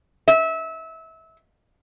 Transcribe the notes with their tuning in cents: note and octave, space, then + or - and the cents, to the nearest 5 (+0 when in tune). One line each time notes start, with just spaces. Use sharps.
E5 -25